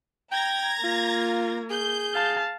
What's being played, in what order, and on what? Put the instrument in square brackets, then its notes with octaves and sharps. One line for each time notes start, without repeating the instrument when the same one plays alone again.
[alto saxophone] G5 [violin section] A#5 G#6 A#6
[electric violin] A#3 [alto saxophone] F4
[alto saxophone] G#4 [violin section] G6
[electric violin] F5 A5